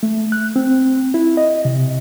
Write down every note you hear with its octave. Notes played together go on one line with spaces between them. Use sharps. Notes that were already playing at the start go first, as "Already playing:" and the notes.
A3
F#6
C4
E4
D#5
C3